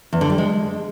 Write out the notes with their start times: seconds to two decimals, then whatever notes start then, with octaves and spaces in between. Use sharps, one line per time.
0.13 E2
0.21 D3
0.30 G3
0.38 G#3